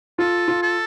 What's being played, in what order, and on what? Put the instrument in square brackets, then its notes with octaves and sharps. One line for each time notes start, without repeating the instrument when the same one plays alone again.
[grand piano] F4 [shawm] A4
[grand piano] F4
[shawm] A4